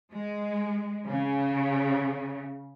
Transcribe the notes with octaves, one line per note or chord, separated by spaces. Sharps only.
G#3
C#3